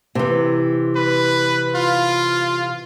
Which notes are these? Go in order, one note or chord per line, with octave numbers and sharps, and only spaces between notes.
C3 E3
B4
F4